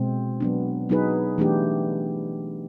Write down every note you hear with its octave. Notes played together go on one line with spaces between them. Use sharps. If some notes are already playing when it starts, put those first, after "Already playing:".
Already playing: B2 G#3 C4
F#3 B3 D4
F#3 B3 D#4 G#4 B4
E3 A3 D4 G4